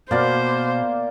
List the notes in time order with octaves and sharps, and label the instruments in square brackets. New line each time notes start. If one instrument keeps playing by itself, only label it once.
[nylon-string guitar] B2 [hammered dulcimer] A#3 D5 F5 [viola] C5